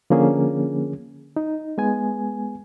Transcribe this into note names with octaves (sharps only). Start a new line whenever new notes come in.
D3 F3 A#3 C#4 G#4
D#4
G#3 B3 G#5